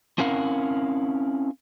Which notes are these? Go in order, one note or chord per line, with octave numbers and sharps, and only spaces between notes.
C4 C#4 E4 A#4 F5 F#5